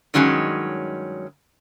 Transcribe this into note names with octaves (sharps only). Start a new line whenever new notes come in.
G2 D#3 F#3 G#3 C#4